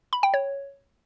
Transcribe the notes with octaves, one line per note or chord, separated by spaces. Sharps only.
B5
G5
C#5